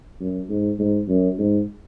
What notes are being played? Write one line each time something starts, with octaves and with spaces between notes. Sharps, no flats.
F#2
G#2
G#2
F#2
G#2